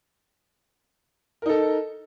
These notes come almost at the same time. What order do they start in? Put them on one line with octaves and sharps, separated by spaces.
A#4 D#4 A4